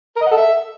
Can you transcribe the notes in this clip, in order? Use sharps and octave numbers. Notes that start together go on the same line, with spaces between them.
A#4
D#5
F#5
A4
E5